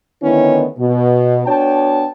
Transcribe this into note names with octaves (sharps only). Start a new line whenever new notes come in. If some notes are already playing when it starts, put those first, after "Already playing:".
D3 D#3 A3 B3 C#4 E4
B2
B3 D4 F#4 C#5 G5 A5